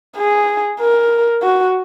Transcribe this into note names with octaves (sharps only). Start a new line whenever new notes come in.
G#4
A#4
F#4